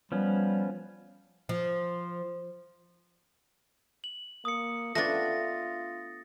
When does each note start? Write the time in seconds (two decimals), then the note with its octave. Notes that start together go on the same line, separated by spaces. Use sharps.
0.12 F3 G3 B3 C#4
1.49 F3
4.04 F#7
4.45 A#3 D#6 C#7
4.95 A3 B3 D4 F4 A6 A#6